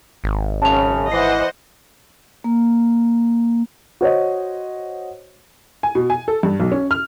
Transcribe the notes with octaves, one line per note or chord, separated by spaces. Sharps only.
G#1
F#2 C#3 A5 F7
E3 C5 D#5 F#5 C7
A#3
F#4 C5 C#5 D#5
G#5
B2
G#5
A4
G2
B1
C#4
F6